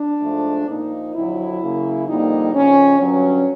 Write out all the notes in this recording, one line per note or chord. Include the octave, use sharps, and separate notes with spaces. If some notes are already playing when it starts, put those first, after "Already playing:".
Already playing: D4
G#2 F3 A3
A#2 F3 A#3 D#4
F2 D3 F#3 E4
C#3 F#3 A#3
F2 D3 G3 A#3 D#4
F2 C#3 F3 C#4
G2 D3 F#3 C#4